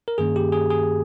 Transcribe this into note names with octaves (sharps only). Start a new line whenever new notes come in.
A#4
G2 D#3 A#3 C#4 G#4
G4
G#4
G#4